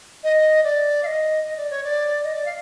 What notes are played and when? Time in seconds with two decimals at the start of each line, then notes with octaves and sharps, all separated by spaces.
0.24 D#5
0.64 D5
1.03 F5
1.06 D#5
1.44 D#5
1.57 D5
1.70 C#5
1.84 D5
2.24 D#5
2.35 D5
2.46 F5